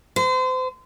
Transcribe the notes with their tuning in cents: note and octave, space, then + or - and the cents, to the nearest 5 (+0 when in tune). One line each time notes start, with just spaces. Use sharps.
C5 -35